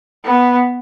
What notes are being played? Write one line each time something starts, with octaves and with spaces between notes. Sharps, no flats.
B3